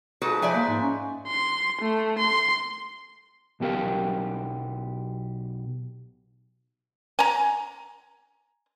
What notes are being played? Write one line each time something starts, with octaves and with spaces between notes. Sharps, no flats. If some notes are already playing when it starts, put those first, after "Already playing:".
F3 G#3 D#4 F#4 A4 B4
F3 B4 D5 E5 G#5
A#3
G#2
C#4
C6
A3
C6
B1 B2 G4 A#4 F5
G#5 A#5